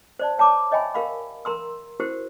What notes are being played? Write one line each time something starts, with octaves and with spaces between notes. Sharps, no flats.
C5 D5 A5
C#5 A5 A#5 D6
C#5 D#5 E5 G5 G#5 B5
G4 A#4 F5 B5
A#4 A#5 C6 E6
E4 F#4 G4 A#4 C5